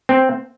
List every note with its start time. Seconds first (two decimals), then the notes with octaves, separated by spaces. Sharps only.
0.09 C4